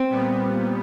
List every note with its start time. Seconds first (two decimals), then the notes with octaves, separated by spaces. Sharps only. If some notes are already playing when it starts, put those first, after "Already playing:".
Already playing: C4
0.10 A#2 G3 B3